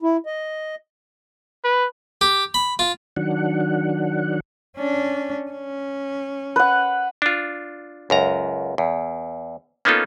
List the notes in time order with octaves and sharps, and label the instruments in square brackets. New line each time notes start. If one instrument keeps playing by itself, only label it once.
[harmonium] E4
D#5
[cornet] B4
[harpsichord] G4
B5
F4
[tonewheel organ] D#3 F#3 D4 F#5
[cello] C#4 D4
C#4
[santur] B4 F#5
[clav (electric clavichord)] D4 F4
C#2 F#2 A#5
E2
A#3 B3 C#4 D#4 F4 A4